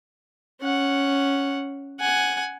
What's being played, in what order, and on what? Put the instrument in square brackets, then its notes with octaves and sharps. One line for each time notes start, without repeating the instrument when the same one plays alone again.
[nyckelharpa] C#4 F#5
F#5 G#5